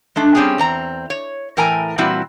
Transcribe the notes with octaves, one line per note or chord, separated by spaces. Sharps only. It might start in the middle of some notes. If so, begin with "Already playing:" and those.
G#3 A3 D4
G3 C4 C#4 G4 G#4
E2 C4 A#5
C#5
A2 E3 A#4 G5 G#5 A#5
A#2 E3 G3 C4 E4 F#4